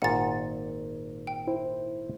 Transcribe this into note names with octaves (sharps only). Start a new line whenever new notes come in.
G#1 A#2 G#4 F#5 A6
G5
E4 C5